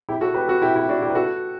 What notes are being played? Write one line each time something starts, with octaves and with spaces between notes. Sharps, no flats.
E4 G4
F#4 A4
G4 B4
F#4 A4
E4 G4
E4 G4
D4 F#4
E4 G4
B4
F#4 A4